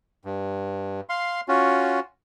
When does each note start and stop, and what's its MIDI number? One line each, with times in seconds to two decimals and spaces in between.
0.25 1.01 43
1.09 1.41 77
1.09 1.41 84
1.48 2.00 61
1.48 2.00 65
1.48 2.00 66